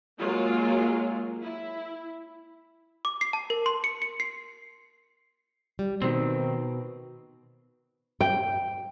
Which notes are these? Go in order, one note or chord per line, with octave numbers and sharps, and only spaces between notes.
F#3 G#3 A#3 F4
E4
D6
C7
A5
A#4
C6
C#7
C#7
C7
G3
B2 D#3 C4
G5